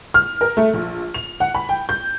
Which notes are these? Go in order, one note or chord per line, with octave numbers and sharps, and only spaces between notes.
F6
A#4
A3
A#1
F7
F#5
B5
G5
G6